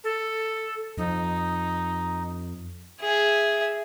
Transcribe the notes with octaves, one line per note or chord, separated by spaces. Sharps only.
A4
F2 D#4
G#4 E5